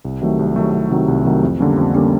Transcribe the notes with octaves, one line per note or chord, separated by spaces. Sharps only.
C2
C3 D#3 F#3 A3
C2
C3 D#3 F#3 A3
C2
C3 D#3 F#3 A3
C2
C3 D#3 F#3 A3
F2
D3 G3 A#3 C#4
F2
D3 G3 A#3 C#4